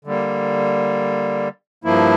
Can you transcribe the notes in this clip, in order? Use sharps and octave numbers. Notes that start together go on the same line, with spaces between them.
D3 G3 A#3
G2 F3 A#3 E4